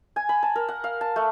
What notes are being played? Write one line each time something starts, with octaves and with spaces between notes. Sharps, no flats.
G#5
B5
A5
A#4
F#5
F5
A5
A3